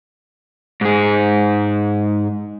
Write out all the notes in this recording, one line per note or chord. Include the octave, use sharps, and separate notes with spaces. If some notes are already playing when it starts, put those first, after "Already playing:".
G#2 G#4